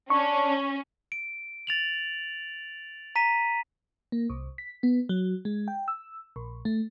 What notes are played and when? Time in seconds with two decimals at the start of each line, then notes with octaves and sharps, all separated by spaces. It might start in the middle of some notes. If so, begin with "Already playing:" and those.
0.10 C#4 D4 C#6
1.12 D7
1.67 A6 F7 F#7
3.16 A#5 B6 D#7
4.12 A#3
4.30 C2
4.58 B6
4.83 B3
5.09 F#3
5.45 G#3
5.68 G5
5.88 E6
6.36 A#1
6.65 A3